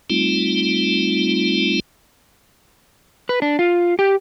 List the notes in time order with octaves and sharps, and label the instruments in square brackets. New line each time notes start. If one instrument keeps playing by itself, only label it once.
[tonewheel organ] G3 A3 C4 D#4 F4
[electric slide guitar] B4
D4
F4
G4